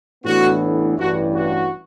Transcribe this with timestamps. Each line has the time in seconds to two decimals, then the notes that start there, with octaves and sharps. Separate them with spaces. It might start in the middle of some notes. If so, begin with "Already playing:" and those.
0.25 A1 A2 E3 B3 D4 F#4
0.98 A1 G2 E3 F#4
1.35 F#4